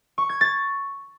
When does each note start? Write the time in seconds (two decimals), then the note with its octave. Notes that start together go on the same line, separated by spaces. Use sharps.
0.18 C#6
0.29 G#6
0.41 A6